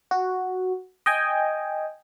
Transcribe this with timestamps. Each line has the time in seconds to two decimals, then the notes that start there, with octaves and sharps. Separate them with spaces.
0.11 F#4
1.06 D#5 G5 G#5